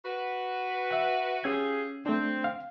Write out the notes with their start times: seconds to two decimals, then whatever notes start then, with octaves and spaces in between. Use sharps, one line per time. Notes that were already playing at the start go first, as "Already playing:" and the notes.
0.05 F#4 B4
0.91 E5 F#5
1.44 C#4 F4 G4 G#4 E6 G#6
2.06 A3 C4 D4
2.44 F5